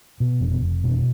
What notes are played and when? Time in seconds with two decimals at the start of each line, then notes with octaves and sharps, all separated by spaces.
0.20 B2
0.41 F1
0.62 F1
0.84 B2